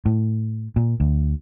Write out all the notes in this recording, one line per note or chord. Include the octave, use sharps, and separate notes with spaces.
A2
A#2
D2